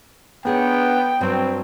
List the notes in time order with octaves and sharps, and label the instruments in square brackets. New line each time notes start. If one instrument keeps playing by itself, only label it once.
[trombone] B3 [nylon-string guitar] D4 G#4 C#5 [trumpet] G5
[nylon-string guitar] G2 F#3 [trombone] C4